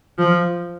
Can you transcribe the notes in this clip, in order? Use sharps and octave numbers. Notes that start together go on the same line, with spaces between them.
F3